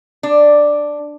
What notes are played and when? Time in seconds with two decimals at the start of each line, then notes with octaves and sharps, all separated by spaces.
0.23 D4